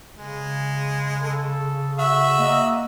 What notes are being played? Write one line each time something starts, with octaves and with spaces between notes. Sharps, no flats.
C#3 G#3
A4
F#4 E5 E6
A#3 D#5